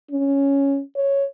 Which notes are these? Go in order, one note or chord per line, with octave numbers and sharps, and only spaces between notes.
C#4
C#5